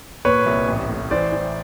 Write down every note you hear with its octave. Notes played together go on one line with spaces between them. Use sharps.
A#2 B4 C#5
C2
A1
A2
E3 C5 D5
E3